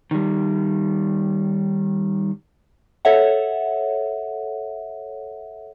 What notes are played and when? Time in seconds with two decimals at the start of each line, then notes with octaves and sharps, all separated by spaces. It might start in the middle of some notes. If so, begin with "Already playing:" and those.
0.11 D#3 G3
3.05 A4 C#5 E5 F#5